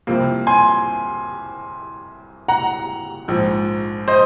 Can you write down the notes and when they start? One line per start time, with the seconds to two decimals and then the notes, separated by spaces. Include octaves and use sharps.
0.07 C2 C3 F3 A#3
0.47 G#5 C6
2.48 F#5 A#5
3.28 A#1 G#2 F3
4.08 C5 D#5